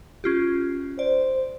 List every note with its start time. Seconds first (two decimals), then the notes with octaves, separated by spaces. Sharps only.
0.24 C#4 F4 G4
0.99 C5 D5